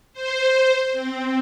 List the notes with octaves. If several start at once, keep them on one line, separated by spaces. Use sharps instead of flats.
C5
C4